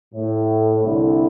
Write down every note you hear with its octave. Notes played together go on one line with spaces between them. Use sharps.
A2
C2 D3 E4